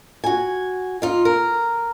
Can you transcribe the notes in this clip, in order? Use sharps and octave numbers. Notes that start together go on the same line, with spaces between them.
F#4 G#5
D#4 F4
A#4